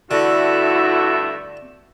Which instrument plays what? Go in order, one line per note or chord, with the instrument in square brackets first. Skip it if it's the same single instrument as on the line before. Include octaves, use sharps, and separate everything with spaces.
[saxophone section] G2 A3 E5 [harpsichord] D3 [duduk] E4 [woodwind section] F#4